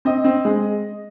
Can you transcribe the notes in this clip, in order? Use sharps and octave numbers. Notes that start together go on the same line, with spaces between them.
C4 D#5
C4
G#3